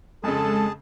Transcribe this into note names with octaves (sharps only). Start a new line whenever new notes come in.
F2 C#3 G#3 G#4 A4 A5